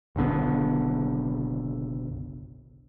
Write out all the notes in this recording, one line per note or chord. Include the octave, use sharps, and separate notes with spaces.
F#1 B1 D3 B3